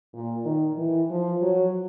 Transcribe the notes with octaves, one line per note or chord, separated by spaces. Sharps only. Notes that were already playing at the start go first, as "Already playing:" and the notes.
A#2
D#3
E3
F3
F#3